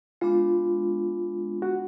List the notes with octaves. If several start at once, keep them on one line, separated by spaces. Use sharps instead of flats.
G#3 B3 D4 F4
F#4